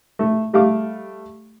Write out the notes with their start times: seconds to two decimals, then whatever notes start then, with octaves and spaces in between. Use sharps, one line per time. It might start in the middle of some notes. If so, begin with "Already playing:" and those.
0.19 A3
0.53 G3 A3 F5 D6